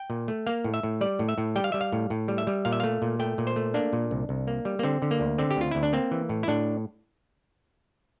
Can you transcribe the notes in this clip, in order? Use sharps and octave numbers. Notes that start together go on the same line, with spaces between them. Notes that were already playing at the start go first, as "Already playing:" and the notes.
Already playing: G5
A#2
A3
A#3 F5
A2
E5
A2
G3 D5
A2
E5
A2
G3 G5
F5
G3 E5
F5
A2
A2
G3
E5
G3
A#2 F5
E5
A3 F5
A#2
A3 G5
A#2
C5
A3
A#3 D4
A#2
C2
C2
A#3
G3
A#3
D3 C4
D3
A#3
D2
D3 C4
G4
D2 F4
D2 E4
D4
A#3 C4
E3
A2
E4
A2 D4